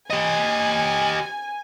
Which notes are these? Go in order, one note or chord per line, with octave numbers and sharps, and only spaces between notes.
G4 D#5 G#5